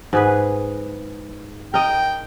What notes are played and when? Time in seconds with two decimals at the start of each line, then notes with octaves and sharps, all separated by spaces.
0.13 G#2 G#4 B4
1.74 A#4 D#5 G5